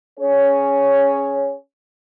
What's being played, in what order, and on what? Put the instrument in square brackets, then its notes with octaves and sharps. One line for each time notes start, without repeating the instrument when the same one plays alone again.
[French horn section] C#4 G#4 C#5